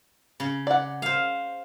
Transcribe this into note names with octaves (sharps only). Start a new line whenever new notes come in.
C#3
D5 F#5
C5 F5